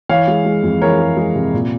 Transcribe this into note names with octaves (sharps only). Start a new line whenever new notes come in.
E3 C#5 F5
G#3
G#3
F2
E3 A#4 C#5
G#3
G#3
C3
A#2